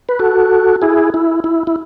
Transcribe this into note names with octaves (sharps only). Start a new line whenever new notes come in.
B4
F#4 A4
E4 G#4
E4
E4
E4